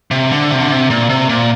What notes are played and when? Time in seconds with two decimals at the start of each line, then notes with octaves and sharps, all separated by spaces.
0.11 C3
0.31 D3
0.51 C3
0.60 D3
0.70 C3
0.90 A#2
1.09 C3
1.29 A#2